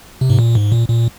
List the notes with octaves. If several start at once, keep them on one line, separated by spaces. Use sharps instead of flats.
C3
G#2
A#2
G#2
A#2
A#2